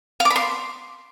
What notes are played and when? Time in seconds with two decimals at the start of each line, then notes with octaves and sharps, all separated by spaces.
0.20 F5
0.25 D6
0.30 B5
0.36 C6